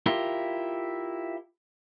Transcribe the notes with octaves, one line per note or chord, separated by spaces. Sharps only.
E4 F4 G4 A#4